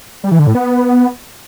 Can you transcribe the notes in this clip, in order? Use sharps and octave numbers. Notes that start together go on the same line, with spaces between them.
G3
E3
D3
A2
B3